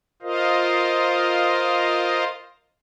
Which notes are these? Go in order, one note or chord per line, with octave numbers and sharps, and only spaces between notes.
F4 A#4 C5 D#5 F5